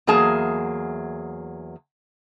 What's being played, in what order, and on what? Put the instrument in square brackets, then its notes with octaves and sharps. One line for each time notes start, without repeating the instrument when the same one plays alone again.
[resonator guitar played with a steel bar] E2 F#3 A#3 G#4 A5